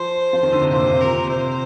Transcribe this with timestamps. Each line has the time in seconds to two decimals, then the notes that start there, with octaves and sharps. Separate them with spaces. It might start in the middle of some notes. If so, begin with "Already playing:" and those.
Already playing: F3 C5
0.33 F3
0.43 D#3
0.52 D3
0.62 C3
0.71 A#2 C5
0.82 C3
0.91 A#2
1.01 C3 A#4
1.30 C3 C5